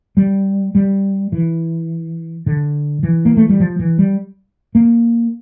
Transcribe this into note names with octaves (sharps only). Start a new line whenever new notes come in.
G3
G3
E3
D3
E3
A#3
A3
G3
F3
E3
G3
A#3